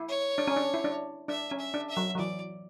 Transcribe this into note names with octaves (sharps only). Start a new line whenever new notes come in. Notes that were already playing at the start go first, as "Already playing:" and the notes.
Already playing: E4
C#5
D4
C#4
D4
E4
D4
D4 E5
C#4
E5
D4
E5
F#3
F#3
E3 D5